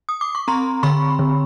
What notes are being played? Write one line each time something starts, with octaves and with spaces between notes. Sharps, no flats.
D#6
D6
C#6
C4 A#5 C6
D3 B5 C#6
D3